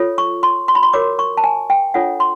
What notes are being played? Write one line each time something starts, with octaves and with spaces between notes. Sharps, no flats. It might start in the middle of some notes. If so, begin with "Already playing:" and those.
Already playing: F4 A4 C#5
C#6
C6
C6
B5
C6
F#4 A#4 C#5 D6
C#6
A5
G#5
G5
D4 F4 A4 C#5 F#5
C6